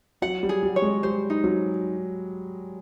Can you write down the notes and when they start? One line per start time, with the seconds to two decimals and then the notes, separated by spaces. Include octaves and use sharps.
0.22 F#3 F#5
0.43 G3
0.49 G#4
0.63 G3
0.76 C#5
0.82 G#3
1.03 G3 C5
1.30 D#4
1.44 F#3